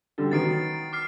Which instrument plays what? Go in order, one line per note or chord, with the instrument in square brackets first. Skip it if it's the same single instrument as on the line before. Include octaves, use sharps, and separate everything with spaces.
[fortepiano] D3 G3 A4
[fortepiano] D#3 F#3 B3 [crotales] A6 C7 D7
[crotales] D6 F6 C7